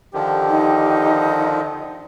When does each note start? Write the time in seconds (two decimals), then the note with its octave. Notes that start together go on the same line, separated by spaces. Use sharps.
0.14 D3 D#3 F3 G4
0.49 D#4